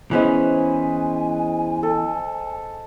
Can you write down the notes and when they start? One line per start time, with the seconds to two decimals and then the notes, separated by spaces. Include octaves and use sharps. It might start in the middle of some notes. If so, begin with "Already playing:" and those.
0.11 E3 G#3 B3 C#4 C5 G#5 B5
1.83 A4